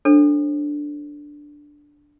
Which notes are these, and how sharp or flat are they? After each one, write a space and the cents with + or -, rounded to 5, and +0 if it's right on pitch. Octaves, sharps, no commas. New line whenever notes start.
D4 +0 A4 +10 C5 +40